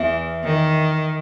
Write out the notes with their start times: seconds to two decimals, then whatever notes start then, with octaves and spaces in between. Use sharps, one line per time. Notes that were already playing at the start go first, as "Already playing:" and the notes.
Already playing: E2 E3
0.43 D#3